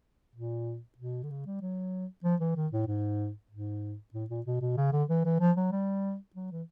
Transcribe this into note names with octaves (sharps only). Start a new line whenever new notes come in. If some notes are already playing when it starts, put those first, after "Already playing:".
A#2
B2
D3
C#3
G3
F#3
F3
E3
D#3
A2
G#2
G#2
A2
A#2
B2
B2
C#3
D3
E3
E3
F3
F#3
G3
F#3
E3